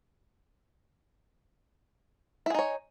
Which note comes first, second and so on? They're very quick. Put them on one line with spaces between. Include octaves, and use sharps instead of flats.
E4 G#4 D#4 C#5